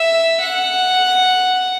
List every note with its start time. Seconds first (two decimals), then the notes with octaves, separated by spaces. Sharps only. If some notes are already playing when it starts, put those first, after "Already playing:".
Already playing: E5
0.40 F#5